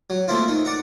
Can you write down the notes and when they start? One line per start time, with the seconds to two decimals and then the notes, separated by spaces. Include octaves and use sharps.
0.10 F#3
0.28 A3 A#3 C4 E4 F4
0.48 D#3 D#4
0.65 D5 F#5 A#5